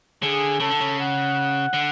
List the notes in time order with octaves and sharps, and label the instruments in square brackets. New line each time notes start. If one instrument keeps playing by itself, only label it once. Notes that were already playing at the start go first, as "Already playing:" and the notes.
[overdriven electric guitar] D3 [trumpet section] G#4
[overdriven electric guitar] C#3 [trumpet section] A4
[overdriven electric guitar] D3
C#3
[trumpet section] F#5
[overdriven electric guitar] D3